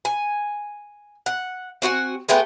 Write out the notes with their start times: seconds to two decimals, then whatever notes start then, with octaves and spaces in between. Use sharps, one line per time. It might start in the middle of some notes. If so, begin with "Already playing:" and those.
0.05 G#5
1.26 F#5
1.82 C4 F#4 F#5 G#5
2.29 G#3 A3 B3 G5